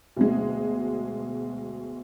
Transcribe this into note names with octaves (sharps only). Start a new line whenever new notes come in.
D2 B2 G#3